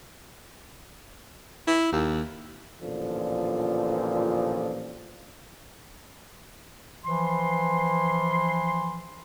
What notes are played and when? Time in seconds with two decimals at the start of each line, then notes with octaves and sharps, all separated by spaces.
1.67 E4
1.92 D#2
2.82 A1 A#2 D3 F3
7.05 E3 F3 C6